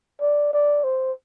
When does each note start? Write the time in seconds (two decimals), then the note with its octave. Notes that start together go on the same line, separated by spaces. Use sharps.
0.21 D5
0.53 D5
0.84 C5